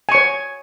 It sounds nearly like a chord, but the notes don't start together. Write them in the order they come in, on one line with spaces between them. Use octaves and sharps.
G#5 C#6 C#5